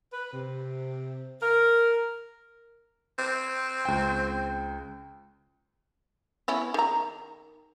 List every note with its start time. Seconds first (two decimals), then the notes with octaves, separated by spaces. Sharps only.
0.12 B4
0.31 C3
1.42 A#4
3.19 C4
3.85 C#2 G5
6.48 B3 C#4 E4
6.74 D#3 A#5